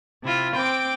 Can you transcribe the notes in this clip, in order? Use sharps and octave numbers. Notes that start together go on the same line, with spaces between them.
C3 E4 F4
C4 G5 D6